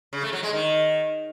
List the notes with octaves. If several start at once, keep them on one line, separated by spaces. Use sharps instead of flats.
C#3
A3
F#3
G#3
D#3